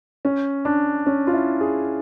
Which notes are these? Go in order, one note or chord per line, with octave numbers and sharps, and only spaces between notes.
C#4
D4
C#4
F4
E4
G#4